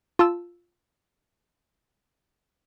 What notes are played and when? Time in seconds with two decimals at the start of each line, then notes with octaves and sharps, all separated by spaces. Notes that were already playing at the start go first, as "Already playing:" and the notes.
0.19 F4 A5 E6